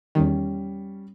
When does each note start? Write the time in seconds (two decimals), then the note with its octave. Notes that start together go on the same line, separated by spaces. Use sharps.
0.15 E2 D#3 G3 C#4